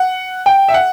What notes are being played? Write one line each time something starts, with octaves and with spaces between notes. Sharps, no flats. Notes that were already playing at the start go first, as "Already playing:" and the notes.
Already playing: F#5
G5
E5
F#5